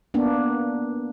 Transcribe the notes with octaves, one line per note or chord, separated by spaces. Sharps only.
A#3 B3 D4